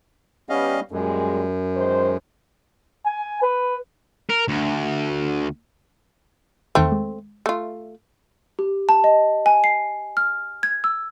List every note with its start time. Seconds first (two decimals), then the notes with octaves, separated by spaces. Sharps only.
0.49 G3 B3 C#4 D#5 F5
0.91 F#2 A#2 G3 G#3
1.77 D#3 G#3 C5
3.06 G#5
3.42 B4
4.30 A#4
4.48 D2
6.75 E2 D#3 A3 C4 F6
6.92 G#3
7.46 A3 F4
8.59 G4
8.89 A5
9.04 D#5
9.46 G#5
9.64 C7
10.17 F6
10.63 G#6
10.84 E6